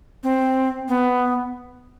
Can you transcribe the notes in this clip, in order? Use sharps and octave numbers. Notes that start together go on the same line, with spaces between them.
C4
B3